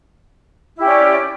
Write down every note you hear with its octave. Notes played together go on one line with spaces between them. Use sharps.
C#4 E4 G4 D5